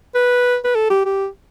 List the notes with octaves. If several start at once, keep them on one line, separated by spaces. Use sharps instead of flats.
B4
B4
A4
G4
G4